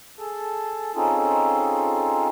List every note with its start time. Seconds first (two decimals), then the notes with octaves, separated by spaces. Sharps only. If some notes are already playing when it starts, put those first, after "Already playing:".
0.19 G#4 A4 A5
0.95 C4 C#4 D#4 F4 G#4 A4